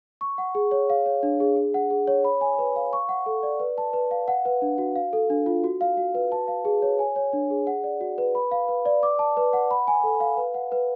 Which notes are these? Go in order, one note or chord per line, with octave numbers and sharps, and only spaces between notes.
C#6
F#5
G#4
C#5
F5
C#5
D4
G#4
G#4
F#5
G#4
C#5
B5
G#5
B4
F5
C#6
F#5
A4
D5
B4
A5
B4
F5
F#5
B4
D4
F#4
F5
A4
D4
F4
F#4
F5
F#4
B4
A5
F5
G#4
C#5
G#5
C#5
D4
G#4
F#5
D5
F#4
B4
B5
F5
B4
D5
D6
A5
B4
F#5
B5
G#5
A4
F5
B4
F#5
B4